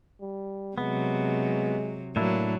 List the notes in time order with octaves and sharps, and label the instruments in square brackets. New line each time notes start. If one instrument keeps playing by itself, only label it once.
[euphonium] G3
[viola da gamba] C3 F#3 [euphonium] G#3 [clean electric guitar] B3
[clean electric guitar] A2 D4 E4 [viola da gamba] F#3 [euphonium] A#3